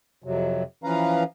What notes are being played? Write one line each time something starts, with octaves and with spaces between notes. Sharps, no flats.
F2 C3 F#3
E3 F3 C#4 B4 F5 A#5